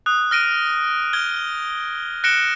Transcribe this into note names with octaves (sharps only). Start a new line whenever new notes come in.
D#6 F#6
F6 A#6 D7 D#7
F6 G#6 G7
F#6 A#6 C#7 D7 E7 G7